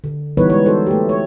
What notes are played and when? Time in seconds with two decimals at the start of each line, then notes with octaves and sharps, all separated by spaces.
0.04 D3
0.37 E3 G3 B3 D#4 B4 C#5
0.50 G#3 C#5
0.66 D#4 F#4 A4 C5
0.87 A3 G4
1.09 C#5